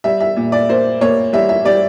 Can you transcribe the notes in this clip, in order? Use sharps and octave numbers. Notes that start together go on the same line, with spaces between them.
G3 E5
E5
A#2
D5
A#3 C5
A#3 C#5
G3 E5
E5
G3 D5